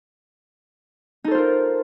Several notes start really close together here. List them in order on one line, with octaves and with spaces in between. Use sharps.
D#4 A4 C5 F4 A#4